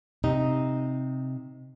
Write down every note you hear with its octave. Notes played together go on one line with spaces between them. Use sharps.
C3 D#4